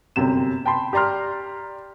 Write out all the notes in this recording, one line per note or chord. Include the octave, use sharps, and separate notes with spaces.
G1 F#2 C3 E7
G5 A5 B5 C6
G4 D5 A#5 C6 F6